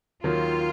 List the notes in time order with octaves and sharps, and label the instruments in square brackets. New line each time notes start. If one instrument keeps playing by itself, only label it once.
[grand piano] D#2 D#3 F#3 A#3 [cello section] F4